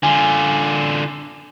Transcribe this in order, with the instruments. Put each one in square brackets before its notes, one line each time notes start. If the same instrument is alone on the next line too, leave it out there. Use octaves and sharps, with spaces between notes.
[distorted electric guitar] D3 F4 [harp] G#5